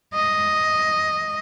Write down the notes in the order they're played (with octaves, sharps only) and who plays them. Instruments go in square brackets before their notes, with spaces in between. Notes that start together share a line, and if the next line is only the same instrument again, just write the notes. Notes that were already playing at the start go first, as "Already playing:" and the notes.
[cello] D#5